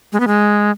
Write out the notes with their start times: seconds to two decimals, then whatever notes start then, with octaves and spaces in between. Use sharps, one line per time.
0.13 G#3
0.20 B3
0.27 G#3